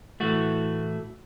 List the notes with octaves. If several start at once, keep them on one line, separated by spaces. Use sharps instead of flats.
A2 E3 A3 F#4